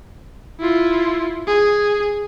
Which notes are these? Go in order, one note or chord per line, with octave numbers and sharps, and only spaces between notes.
E4 F4
G#4